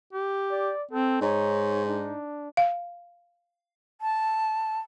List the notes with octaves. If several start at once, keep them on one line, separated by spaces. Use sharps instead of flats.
G4
D5
C4 A4
G#2 D#4 C#5
D4
F5
A5